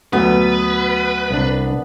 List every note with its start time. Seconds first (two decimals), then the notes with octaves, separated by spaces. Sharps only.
0.13 D2 F#3 B3 B4
1.31 C2 D4